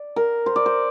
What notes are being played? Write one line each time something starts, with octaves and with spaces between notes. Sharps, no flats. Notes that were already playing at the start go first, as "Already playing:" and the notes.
Already playing: D5
A#4
C5
D5
C5